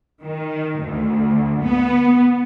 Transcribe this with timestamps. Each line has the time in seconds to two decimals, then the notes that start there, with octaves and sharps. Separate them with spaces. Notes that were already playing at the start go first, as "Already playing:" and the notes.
0.24 D#3
0.80 D2
1.63 B3